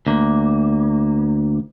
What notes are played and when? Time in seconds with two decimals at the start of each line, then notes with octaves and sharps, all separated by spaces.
0.07 D2 A#3